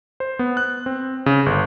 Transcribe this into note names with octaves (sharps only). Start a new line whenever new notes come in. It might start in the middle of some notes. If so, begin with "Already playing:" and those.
C5
B3
F#6
C4
C#3
G1